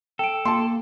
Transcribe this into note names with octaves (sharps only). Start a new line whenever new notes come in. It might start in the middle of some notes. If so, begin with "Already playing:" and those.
A4 G5 D7
A#3 A5 C6